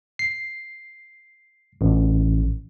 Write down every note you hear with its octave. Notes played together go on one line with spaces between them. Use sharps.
C7
A1